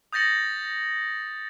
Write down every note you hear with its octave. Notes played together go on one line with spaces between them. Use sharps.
D#6 G6 A6 A#6 C#7 F#7